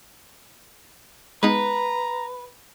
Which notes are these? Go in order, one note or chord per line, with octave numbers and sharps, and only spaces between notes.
G#3 B3 D#4 B4 A#5